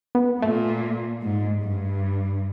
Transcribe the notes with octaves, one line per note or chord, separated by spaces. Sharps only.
B3
A#2 A3
G#2
G2